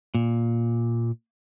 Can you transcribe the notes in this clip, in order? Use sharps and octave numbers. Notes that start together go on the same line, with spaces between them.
A#2